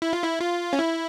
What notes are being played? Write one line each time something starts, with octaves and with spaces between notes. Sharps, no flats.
E4
F4
E4
F4
C#4
E4